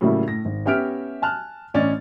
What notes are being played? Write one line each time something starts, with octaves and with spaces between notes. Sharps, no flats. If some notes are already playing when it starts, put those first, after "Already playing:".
A2 C#3 F#3 G3 A#3 E4
A2 A#6
G#1
B3 C#4 G4 E5 F6 D7
G#5 A5 F6 F#6
A1 C#4 D5 D#5 A6